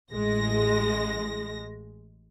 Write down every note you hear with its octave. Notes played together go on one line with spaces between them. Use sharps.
A1 G#3 A#6